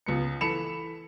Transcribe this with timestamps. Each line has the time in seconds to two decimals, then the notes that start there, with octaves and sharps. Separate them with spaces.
0.06 C#2 B3 C#7
0.41 E3 A4 B5 C#7 E7 F7